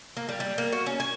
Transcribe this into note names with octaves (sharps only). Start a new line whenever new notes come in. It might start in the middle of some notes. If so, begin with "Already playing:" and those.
A#3
G3
G3
A#3
F#4
C#4
G#5